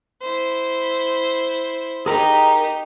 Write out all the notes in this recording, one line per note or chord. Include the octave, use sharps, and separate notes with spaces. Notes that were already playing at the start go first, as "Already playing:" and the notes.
E4 C5
D#4 G4 G#4 A#4 A#5